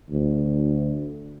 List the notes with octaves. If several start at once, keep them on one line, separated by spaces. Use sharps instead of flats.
D2